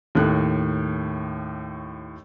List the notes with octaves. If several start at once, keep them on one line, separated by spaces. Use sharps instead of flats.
D#2 A2 F#6